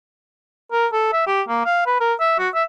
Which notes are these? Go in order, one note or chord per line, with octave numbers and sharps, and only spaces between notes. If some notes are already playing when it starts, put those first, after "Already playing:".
A#4
A4
E5
G4
A#3
F5
B4
A#4
E5
F#4
E5